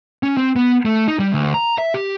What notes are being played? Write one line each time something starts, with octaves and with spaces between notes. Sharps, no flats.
C#4
C4
B3
A3
D#4
G3
D2
A#5
E5
G4